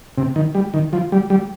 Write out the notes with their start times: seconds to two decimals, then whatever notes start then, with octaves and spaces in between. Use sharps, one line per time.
0.17 C3
0.36 D#3
0.55 G3
0.74 D#3
0.93 F3
1.12 G3
1.30 G3